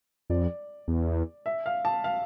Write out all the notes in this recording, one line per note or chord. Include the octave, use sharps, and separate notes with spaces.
F2 D5
E2
E5
F5
A5
F5